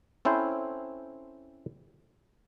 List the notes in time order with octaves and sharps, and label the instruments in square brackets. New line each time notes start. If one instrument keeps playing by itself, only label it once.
[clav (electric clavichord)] C4 C#4 E4 A4 C5